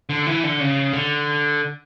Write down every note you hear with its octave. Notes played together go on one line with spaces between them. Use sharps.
D3
E3
D3
C#3
D3